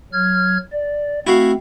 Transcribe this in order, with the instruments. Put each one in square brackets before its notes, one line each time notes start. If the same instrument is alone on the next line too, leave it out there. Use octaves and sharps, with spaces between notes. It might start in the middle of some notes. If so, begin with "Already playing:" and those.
[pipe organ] F#3 F6 G#6
D5
[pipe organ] A3 C4 [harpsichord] E4 F#4 F5